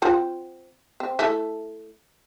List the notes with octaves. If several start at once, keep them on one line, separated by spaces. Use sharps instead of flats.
C4 F4 F#4
C4
A3 E4 A4